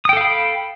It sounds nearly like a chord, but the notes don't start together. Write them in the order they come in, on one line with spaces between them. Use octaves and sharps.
D#6 G5 A4 F5 B5